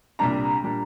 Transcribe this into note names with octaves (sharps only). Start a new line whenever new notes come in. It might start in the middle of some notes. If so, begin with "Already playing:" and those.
C2 A#2 G3 A#3 D4 A#5
A#2 G3 A#3 D4